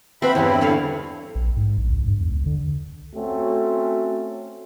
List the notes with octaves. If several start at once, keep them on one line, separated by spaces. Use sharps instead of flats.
F3 C4 B4 E5 F#5 B5
E2 G2 B3 C#4 E4 G4
D3 C#5 F5
A#1
G#2
A#1
C#2
G2
E2
C#2
D3
A3 C4 C#4 F#4